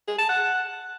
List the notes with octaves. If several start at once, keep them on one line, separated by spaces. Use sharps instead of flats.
G#4
A5
F#5